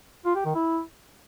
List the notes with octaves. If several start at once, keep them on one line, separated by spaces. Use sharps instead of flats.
F4
G4
D#3
E4